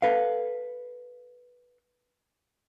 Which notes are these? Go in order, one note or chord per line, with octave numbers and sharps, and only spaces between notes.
A4 B4 F5